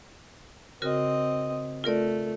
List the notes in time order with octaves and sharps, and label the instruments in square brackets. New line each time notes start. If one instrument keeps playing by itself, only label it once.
[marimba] C#3 F#4 A#4 [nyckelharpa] C4 D#5
[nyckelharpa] A3 [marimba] F4 A#4 D5